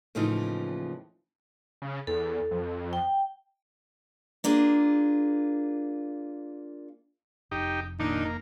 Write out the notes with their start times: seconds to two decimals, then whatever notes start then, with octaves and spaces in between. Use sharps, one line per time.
0.15 D#2 A2 C#3 E3 F3 D#4
1.82 C#3
2.07 E2 A4
2.51 F2
2.93 G5
4.44 A#3 D4 F4 G#4
7.51 F1 D#4 G4
8.00 A#2 D#3 D4 D#4
8.25 A#3